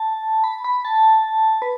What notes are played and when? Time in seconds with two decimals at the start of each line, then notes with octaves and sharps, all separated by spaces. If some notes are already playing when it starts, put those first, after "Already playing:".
Already playing: A5
0.44 B5
0.64 B5
0.85 A5
1.62 B4